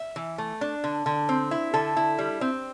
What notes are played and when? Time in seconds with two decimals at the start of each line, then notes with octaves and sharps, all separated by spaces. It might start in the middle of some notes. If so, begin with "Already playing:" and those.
Already playing: E5
0.16 E3
0.38 A3
0.61 D4
0.84 D3
1.06 D3
1.29 C4
1.51 E4
1.74 D3 A4
1.97 E4
2.18 G3
2.41 C4